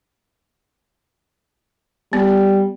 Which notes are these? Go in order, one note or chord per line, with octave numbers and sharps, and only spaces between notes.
G3 B3